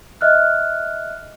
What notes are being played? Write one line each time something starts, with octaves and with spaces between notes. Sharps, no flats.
D#5 E5 F6 F#6